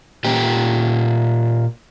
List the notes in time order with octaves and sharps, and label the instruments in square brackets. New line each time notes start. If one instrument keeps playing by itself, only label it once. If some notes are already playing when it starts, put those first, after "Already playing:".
[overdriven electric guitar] A#2 G4